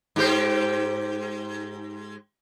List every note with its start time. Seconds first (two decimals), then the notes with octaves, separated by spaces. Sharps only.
0.16 G#2 G4 C5